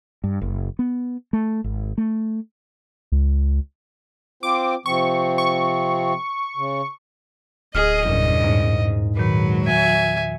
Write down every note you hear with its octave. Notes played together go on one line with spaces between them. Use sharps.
G2
F#1
B3
A3
G#1
A3
C#2
C4 F4 C5 D6
C3 F3 C4 C#6
C#6
C#3
D1 G#4 D#5 D#6 F6
F#1 E2 G2 A#2 C#3
G#2
A#2 D#3 F#3 B4
E5 G#5